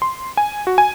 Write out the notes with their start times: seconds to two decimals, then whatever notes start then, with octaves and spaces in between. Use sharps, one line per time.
0.02 C6
0.37 G#5
0.67 F#4
0.78 G#5